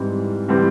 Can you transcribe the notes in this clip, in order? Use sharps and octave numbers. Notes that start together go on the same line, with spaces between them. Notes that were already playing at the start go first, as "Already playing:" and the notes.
Already playing: G#2 E3 G3 C4
E3 G3 C4